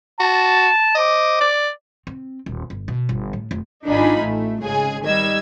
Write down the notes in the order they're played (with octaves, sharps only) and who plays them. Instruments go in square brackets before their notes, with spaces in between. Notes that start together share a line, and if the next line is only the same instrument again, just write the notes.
[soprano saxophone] F#4 [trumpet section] A5
[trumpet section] C5 D6 [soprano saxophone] D#5
[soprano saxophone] D5
[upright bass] C4
D#1
G1
B2
G1
A2
F1
[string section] G#1 D4 D#4 F4 G#5 B5
A1 A3
G#1 C#3 G#3 G#4 G#5
D#3 G3 D#5 E6 G#6